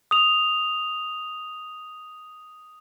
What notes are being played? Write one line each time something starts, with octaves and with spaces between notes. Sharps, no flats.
D#6 F7